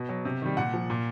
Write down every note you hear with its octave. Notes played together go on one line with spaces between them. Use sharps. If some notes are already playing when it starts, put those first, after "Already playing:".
Already playing: B2
F#3
C3
D#3 G3
A#2 F#5
F3
A#2